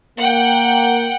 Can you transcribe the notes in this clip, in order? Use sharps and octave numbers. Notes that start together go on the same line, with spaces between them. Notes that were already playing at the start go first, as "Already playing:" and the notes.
A#3 F#5 G5